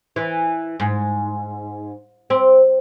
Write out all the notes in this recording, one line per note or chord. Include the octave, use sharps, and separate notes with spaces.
E3
G#2
C4